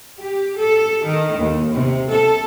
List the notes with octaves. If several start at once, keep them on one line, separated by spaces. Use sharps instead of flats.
G4
A4
D#3
D#2
C3
A4